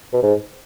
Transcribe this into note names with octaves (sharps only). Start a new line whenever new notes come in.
B2
G#2